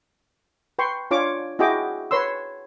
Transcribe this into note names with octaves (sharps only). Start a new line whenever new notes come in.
B4 G5 C6 C#6
D4 F4 C#5 D6
E4 F#4 G#4 D#5 G5 D6
B4 C#5 C6 E6